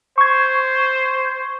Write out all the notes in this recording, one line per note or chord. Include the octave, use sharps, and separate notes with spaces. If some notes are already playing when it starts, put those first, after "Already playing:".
C5 C#6 G#6